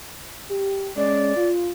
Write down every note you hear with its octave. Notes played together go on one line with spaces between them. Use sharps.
G4
G#3 C#4 D5
F4